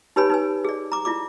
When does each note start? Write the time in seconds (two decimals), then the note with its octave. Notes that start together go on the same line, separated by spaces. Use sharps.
0.16 D#4 G4 B4 C#5 G#5 B5
0.30 D#4 B4 G#5
0.64 G#4 D5
0.92 A#5 D6
1.05 E4 F4 D5 D6